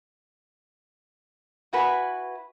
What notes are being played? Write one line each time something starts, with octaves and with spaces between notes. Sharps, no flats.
E4 F#4 B4 G#5